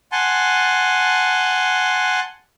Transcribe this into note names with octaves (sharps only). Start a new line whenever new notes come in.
F#5 G#5 A5 C6